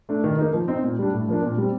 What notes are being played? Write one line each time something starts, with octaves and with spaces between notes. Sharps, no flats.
A3 D4
D#3
A#3 D#4
F3
C4 D#4
A#2
G3 D4
A2
F3 A#3 D4
A#2
G3 C4